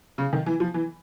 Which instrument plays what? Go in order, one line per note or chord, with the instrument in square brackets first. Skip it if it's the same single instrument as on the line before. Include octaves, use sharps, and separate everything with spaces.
[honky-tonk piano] C#3
D#3
E3
F3
E3